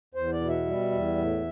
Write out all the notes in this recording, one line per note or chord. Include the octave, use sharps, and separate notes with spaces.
E2 C5
D5
B2
E5
G3
E2
A2